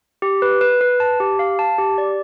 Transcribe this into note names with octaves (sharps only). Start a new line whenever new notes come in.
G4
B4
B4
B4
A5
G4
F5
A5
G4
D5